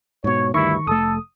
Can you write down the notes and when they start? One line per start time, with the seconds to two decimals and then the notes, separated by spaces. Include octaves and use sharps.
0.24 G#2 B2 C#5
0.54 D2 G2 D#3 E4 C#6
0.87 F1 A3 A4 D#6